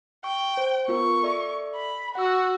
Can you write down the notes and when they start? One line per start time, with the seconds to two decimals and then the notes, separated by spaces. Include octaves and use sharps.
0.24 G5 C#6
0.57 C5
0.88 B3 F4 A#4 C#6
1.23 A4 D5 E5
1.75 B5
2.15 F#4 F#5 E6